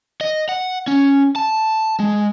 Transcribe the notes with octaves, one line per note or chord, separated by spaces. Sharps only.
D#5
F#5
C#4
A5
G#3